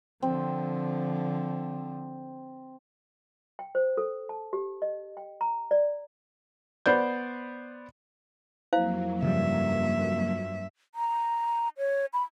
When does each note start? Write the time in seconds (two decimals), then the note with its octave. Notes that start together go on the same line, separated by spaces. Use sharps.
0.22 D3 F3 C4
3.59 G5
3.75 C5
3.97 A4
4.29 A5
4.53 G4
4.82 D#5
5.17 G5
5.41 A#5
5.71 D5
6.86 B3 C5 D5 G6
8.73 F2 F#3 A#3 E4 C5 F5
9.22 G2 C#3 F3 G3 E5
10.95 A#5
11.78 C#5
12.13 B5